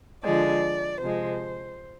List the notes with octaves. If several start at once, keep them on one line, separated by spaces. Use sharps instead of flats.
D3 F3 G#3 D5
C3 F3 G#3 C5